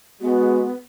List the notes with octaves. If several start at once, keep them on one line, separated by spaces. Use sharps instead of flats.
G#3 B3 F#4